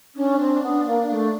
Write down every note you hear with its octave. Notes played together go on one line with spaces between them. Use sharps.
C#4 D4
C4
B3
A#3
A3